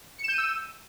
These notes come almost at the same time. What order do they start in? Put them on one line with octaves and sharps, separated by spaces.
C#7 E7 G6 D#7 E6